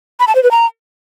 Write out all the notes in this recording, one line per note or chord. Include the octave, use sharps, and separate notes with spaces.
B5
A5
C5
B4
A#5